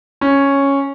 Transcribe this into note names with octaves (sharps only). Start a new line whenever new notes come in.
C#4